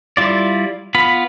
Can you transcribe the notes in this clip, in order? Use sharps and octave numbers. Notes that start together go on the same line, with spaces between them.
G3 E4 F4 D5
B3 F4 B5